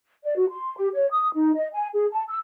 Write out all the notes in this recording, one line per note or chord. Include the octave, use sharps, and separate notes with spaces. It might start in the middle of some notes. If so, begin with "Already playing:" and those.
D5
F#4
C6
G4
C#5
D#6
D#4
D#5
G#5
G#4
A5
E6